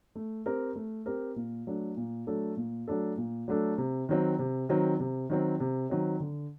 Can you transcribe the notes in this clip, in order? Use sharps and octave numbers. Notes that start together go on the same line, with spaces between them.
A3
C4 G4 A#4
A3
C4 G4 A#4
A#2
F#3 A3 D4 A4
A#2
F#3 A3 D4 A4
A#2
F#3 A3 D4 A4
A#2
F#3 A3 D4 A4
C3
D#3 F#3 C4
C3
D#3 F#3 C4
C3
D#3 F#3 C4
C3
D#3 F#3 C4
D3